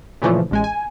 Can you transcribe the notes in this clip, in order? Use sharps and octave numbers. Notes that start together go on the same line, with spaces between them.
A#2 C#3 E3 F3 A3
A1 G#3 G#5
G#5